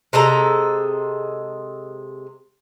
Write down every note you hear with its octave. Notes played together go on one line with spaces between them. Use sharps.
C3 G#3 A4 A#5